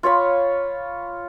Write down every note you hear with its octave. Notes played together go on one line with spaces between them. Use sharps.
F4 C#5 F5 B5